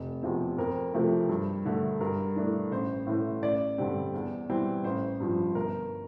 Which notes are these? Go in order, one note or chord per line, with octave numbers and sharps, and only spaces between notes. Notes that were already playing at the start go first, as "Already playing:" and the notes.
Already playing: F1
E2 C3 F3 C4
F2 A#4
C3 F3 A3
G2
D3 A3
G2 A#4
E3 A3 D4
A1 C5
A2 E3 A3
A1 D5
G2 D3 G3 C4
E2
E3 G3 C4
A1 C5
G2 F3
G1 A#4